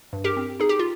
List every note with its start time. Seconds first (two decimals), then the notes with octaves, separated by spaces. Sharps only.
0.13 G2
0.24 G4 A#4
0.37 C4
0.60 D#4 G#4
0.69 G4
0.79 F4